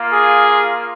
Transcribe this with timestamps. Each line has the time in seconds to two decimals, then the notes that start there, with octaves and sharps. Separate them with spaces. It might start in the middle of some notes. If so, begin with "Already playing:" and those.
Already playing: A#3 F4
0.11 G#4